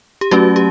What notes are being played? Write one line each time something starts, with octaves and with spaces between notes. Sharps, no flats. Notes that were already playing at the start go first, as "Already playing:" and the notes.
G4
F#3 A3 C#4 F#4
G4